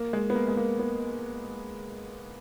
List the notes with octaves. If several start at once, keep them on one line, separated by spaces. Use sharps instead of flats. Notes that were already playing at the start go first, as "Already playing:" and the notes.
Already playing: A#3
G#3
B3
A#3
G#3
A#3
B3